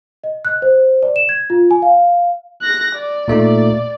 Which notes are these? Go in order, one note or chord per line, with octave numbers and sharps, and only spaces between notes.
D#5
F#6
C5
D5
E7
G#6
F4
G#5
F5
F#6 A#6
D5
A#2 A3 D#4